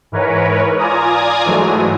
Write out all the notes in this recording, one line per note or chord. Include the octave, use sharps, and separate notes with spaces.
G#2 E3 A#4 B4 C#5
F4 D5 G#5 A#5 D#6
G#2 E3 F#3 G#3 A3